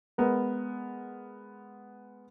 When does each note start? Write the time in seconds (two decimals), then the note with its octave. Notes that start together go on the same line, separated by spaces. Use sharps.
0.18 G#3 B3 A#4